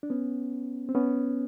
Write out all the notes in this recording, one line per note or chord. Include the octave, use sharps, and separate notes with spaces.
D4
B3 C#4
C4
B3 C#4